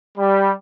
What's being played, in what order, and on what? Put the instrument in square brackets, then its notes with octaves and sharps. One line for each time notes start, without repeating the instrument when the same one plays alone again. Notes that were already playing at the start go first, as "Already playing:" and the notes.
[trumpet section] G3